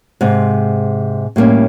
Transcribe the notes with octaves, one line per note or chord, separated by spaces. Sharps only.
G#2 C3
A2 G3 A#3 C#4